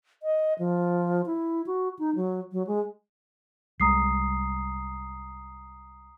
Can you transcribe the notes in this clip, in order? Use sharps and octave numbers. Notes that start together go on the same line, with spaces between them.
D#5
F3
E4
F#4
D#4
F#3
F#3
G#3
C2 G3 G#3 A#5 D#6 C7